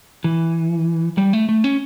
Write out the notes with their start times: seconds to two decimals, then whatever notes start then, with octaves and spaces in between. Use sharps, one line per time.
0.24 E3
1.18 G3
1.33 A3
1.49 A3
1.64 C#4